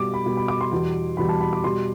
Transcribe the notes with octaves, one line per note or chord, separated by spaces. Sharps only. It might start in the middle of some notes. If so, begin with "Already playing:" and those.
Already playing: B2 G3 D6
B5
B2 G3
B5
D6
C6
E2 B2 G3
E2 B2 G3 B5
A5
B5
D6
B2 G3 C6